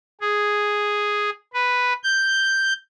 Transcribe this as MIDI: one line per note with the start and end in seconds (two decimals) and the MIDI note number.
0.21 1.30 68
1.54 1.93 71
2.04 2.73 91